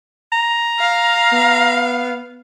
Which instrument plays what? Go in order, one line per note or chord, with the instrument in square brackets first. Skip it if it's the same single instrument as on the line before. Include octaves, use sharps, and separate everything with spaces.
[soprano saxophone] A#5
[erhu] F5
[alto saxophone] B3